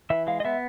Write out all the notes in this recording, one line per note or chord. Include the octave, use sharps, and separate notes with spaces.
E3 E5
G#3 F5
D#5
B3 E5